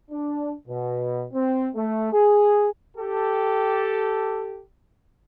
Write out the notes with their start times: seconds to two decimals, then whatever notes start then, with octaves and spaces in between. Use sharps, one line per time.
0.11 D4
0.68 B2
1.34 C4
1.75 A3
2.13 G#4
2.96 G4 A4